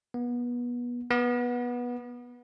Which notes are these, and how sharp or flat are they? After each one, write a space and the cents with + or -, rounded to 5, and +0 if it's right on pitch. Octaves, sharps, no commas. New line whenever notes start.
B3 -25
B3 -15